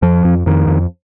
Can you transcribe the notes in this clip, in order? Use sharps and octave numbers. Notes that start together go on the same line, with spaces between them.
F2 F3
F2
F2 D#3
F2